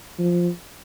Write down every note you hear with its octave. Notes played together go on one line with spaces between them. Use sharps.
F3